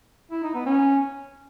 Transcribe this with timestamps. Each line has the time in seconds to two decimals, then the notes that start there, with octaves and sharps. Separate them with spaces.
0.31 E4
0.43 D#4
0.55 B3
0.66 C#4